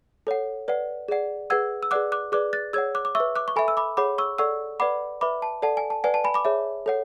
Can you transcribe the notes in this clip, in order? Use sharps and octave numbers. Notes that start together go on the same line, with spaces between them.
A4 C#5 F#5
B4 D5 F#5
G#4 D5 F#5
G#4 B4 F#5 E6 G#6
E6
G#4 B4 D5 F#5 D6 F#6
D6 F#6
G#4 B4 D5 D6 F#6
F#6 A6
G#4 C#5 F#5 E6 G#6
D6 F#6
D6
E5 C#6 E6
B4
D6 F#6
C#6
A4 E5 G#5 B5
E6
B5 D6
G#4 C#5 F#5 B5 D6
C#6 E6
A4 D5 F#5 C#6 E6
B4 D5 F#5 B5 D6
B4 E5 B5 D6
A5
A4 D5 F#5 A5
G#5
A5
B4 D5 F#5 G#5
A5
G#5 B5
B5 D6
G#4 C#5 E5
A4 C#5 F#5